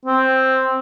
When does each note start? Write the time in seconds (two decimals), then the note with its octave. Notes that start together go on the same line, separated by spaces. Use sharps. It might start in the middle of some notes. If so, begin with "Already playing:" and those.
0.05 C4